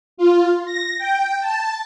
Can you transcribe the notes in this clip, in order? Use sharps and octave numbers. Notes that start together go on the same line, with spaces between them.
F4
A#6
G5
A5